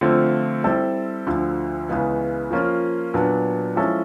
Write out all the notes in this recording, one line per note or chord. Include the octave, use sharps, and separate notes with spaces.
D3 F3 A3 C4 F4
G3 C4 E4 A4
D2 D3 F3
C#2 C#3 E3 G#3 B3
F3 A#3 C#4 F4
A#2 F#3 B3 D4
F3 G#3 C#4 E4 A4